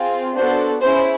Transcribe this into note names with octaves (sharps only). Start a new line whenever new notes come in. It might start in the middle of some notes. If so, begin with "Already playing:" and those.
Already playing: C4 F4 G#4
B3 D4 F#4 A4 C5
C#4 E4 G#4 C5